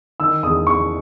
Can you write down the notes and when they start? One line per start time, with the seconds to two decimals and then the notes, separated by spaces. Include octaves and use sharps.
0.20 D#3 E6
0.43 E2 D#6
0.66 E2 C#6